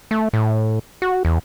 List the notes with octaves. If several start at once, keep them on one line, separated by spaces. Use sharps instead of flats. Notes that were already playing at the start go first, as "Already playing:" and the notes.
A3
A2
F#4
E2